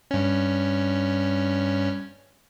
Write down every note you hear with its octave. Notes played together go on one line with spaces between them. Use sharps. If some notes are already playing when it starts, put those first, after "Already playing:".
G2 C#4